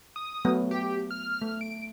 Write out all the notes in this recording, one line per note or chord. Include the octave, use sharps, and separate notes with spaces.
D#6
F#3 A3 B3
G4
F6
A3
D7